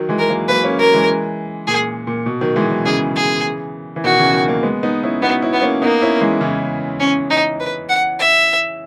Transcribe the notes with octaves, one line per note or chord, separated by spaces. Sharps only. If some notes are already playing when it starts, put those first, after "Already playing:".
Already playing: D#3 F#3
E3 G#3
A#4
F#3 A#3
F#3 A#3 B4
A#3 C#4
F#3 A#3 A#4
E3 G#3
A#2 G#4
A#2
B2
D#3 F#3
E3 G#3
D#3 F#3
C#3 E3 G#4
G#4
E3
B2 D#3 F#4
C#3 E3
D#3 F#3
F#3 A#3
G#3 B3
B3 D#4
C#4 E4
B3 D#4 F#4
C#4 E4
B3
A#3 C#4
A#3 B3 D#4
C#4 E4
E3 G#3
C#3 E3
C#4
D#4
B4
F#5
E5